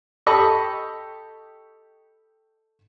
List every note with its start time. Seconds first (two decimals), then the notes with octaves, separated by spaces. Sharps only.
0.26 G4 A4 D#5 B5 C#6